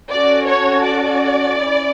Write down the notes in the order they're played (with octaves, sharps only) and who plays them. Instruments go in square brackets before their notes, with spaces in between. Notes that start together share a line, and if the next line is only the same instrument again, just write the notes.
[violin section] C#4 F#4 A4 D5
C#5
D5
C#4 E4